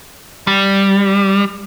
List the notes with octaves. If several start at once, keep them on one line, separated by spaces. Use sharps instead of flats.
G3